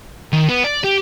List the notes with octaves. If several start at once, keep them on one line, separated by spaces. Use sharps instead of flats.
D#3
B3
D5
G4